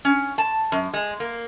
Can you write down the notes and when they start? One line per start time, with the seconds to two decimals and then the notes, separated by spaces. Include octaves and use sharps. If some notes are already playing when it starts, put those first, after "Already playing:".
0.05 C#4
0.38 A5
0.72 F#2
0.94 G#3
1.20 A#3